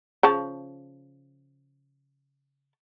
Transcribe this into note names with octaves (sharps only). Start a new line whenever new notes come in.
C#3 F3 A5